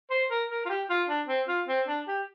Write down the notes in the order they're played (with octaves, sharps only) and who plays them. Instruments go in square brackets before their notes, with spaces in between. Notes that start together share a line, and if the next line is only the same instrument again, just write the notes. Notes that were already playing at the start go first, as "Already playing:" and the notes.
[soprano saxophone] C5
A#4
A#4
F4
G4
F4
D4
C4
F4
C4
D4
G4